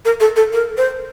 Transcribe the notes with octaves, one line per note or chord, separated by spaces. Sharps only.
A#4
A4
A4
A#4
C5